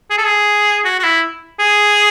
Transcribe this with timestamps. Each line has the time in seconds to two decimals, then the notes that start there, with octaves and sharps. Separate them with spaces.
0.11 G#4
0.18 A4
0.25 G#4
0.85 F#4
0.99 F#4
1.04 E4
1.60 G#4